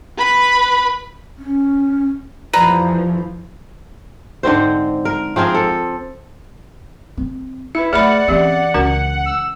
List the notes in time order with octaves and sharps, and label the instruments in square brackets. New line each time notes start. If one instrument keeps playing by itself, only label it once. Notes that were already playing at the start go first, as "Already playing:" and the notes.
[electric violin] B4 B5
[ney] C#4
[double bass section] F2 E3 F3 [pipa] G3 B4 A#5
[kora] G#2 D3 C4 C5
A#4
F3 C4 G#4 A#4
A4
[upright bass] C4
[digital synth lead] E4 [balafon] B4 E5
[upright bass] A3 [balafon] G#4 E5 B5 [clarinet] D5 [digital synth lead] F#5
[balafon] E3 G4 E5 [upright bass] C4 C#4
[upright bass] C#2 [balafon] C#4 F#4 A#4
[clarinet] E6